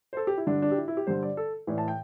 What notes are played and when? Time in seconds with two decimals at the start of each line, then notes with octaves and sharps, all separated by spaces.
0.13 C5
0.17 A4
0.27 G4
0.38 E4
0.47 G2 D3 D4
0.62 D4
0.71 G4
0.78 E4
0.88 E4
0.97 G4
1.07 G2 D3 C5
1.23 D5
1.37 A4
1.67 A2 E3 D5
1.78 A5
1.88 G5